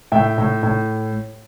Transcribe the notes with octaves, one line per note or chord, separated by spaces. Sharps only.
A2 E5 G5
A2
A2